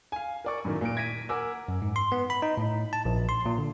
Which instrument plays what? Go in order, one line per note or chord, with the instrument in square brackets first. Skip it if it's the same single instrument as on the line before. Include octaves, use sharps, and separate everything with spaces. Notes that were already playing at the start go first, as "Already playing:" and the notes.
[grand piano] F5 G#5
A#4 D5 C#6
F#2 A2 D#3 A3
A#2 D7
G#6 A#6 B6 D7 D#7
A#4 F#5 G#5 D6 E6
[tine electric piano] F#2
G#2
C6
B3
B5
D#4
A2
A5
A#1
C6
A#2
D3